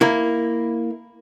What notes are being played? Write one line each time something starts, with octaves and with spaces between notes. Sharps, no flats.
A#3 E4